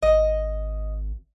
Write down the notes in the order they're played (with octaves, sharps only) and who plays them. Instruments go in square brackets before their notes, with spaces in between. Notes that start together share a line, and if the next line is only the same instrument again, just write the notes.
[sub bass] G#1 [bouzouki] D#5